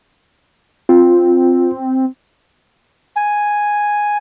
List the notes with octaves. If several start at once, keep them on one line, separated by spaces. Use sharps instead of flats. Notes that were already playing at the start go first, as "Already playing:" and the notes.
C4 F4
G#5